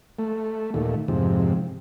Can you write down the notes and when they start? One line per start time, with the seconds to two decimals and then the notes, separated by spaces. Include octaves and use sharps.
0.19 A3
0.74 D#2 A#2 A3
1.08 F2 G#2 C3